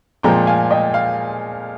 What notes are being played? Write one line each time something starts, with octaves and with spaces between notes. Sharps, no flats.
A#2 F3 G#3 C4 G5 A#5
F5 G#5
D#5 G5
F5